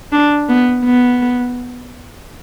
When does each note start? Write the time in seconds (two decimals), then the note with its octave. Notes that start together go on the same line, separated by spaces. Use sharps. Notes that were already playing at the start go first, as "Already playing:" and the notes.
0.12 D4
0.49 B3
0.85 B3